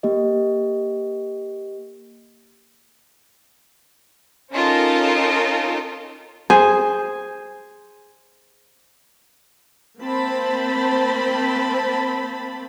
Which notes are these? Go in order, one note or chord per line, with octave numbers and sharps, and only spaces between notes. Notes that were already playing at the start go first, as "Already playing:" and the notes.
A#3 G4 D#5
C#4 D#4 F4 A4 A#4 A5
G#4 C5 G#5
A#3 C4 C5 A5 B5